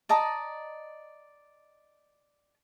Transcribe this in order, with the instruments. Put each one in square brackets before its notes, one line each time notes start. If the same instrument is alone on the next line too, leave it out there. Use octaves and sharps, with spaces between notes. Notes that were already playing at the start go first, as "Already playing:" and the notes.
[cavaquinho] D5 D#5 A5 A#5